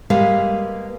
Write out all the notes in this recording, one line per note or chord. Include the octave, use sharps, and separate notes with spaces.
G3 G#3 A#3 B3 F5